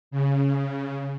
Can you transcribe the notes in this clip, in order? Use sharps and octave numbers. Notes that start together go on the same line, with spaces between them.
C#3